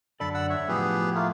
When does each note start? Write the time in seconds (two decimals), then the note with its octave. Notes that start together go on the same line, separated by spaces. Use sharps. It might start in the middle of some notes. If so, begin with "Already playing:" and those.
0.20 F#2 D3 A4 D5 B5
0.34 F#5 E6
0.50 C#5 E5
0.68 A2 F3 B3 G4 G#4
1.15 A3 A#3 F4